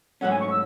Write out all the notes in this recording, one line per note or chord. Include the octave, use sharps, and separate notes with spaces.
G#2 F#3 A3 C#4 F#5
G#5
C#6
E6